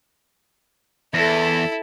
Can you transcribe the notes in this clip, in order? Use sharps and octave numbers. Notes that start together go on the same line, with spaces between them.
E2 E4 A4